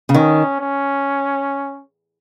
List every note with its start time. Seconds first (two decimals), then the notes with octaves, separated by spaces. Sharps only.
0.09 C#3
0.14 D#3 C#4
0.60 C#4